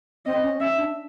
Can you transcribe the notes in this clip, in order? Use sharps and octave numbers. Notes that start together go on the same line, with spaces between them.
C4 D#5
C#4
C#4 E5
D4